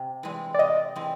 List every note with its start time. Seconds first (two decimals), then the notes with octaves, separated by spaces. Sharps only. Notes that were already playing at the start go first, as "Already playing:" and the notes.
Already playing: C3
0.23 E3 G#3 C4
0.54 D5
0.59 C3 D#5
0.96 E3 G#3 C4